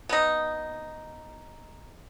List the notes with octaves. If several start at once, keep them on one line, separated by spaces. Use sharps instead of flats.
B3 D#4